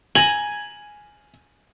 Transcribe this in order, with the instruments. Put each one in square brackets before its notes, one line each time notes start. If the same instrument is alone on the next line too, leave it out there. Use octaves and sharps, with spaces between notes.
[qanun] G#5 A#5 [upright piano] F#7